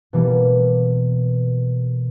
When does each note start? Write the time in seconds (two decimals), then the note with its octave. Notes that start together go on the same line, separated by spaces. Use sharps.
0.13 B2 E3 G3 A#3